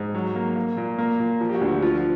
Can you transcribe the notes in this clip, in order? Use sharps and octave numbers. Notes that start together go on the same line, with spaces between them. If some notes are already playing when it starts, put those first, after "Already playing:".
Already playing: G#2
F#3
A#3
A#3
A#2
A#3
A#2
F3
G4
F#4
D2
F#4
F3 F4